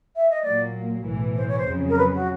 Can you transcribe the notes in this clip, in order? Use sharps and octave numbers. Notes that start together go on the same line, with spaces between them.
E5
D#5
A#2 F#3 A#3 D5
B1 A2 E3
C5
C#5
C5
F2 C#3 F#3
A#4
B4
F#4